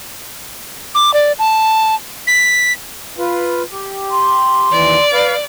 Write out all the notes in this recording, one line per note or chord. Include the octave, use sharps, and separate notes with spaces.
D6
D5
A5
B6
F4 B4
G4
C6
D#2 E3 D5
B4 F5